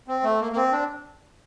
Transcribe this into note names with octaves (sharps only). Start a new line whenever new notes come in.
C4
A3
A#3
A#3
C4
D4